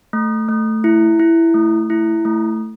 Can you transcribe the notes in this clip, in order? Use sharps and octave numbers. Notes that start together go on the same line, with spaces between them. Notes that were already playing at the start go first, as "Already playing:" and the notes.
A3
A3
E4
E4
A3
E4
A3